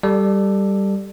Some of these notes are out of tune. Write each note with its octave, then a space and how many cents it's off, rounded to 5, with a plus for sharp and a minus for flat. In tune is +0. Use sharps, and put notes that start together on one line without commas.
G3 +0 A4 +0 D5 +25